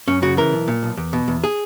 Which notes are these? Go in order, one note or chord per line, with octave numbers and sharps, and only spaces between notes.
F#2 C#4
C#3 F#4
E3 A#4
B1
A#2
B1
E2
B2
E2
G#4